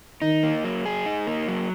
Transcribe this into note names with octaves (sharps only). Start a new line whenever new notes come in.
D#3 D#4
A#3
F#3
G#4
D#4
A#3
F#3